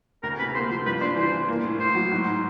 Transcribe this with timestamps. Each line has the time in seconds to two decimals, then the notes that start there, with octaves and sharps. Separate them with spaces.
0.23 D2 A#4
0.39 C3 B4
0.54 A#3 C5
0.70 F3 C5
0.86 G2 B4
1.01 D4 C5
1.17 E3 C5
1.33 E3
1.49 A#3
1.64 A2
1.79 A2 C5
1.95 F#3
2.11 G#2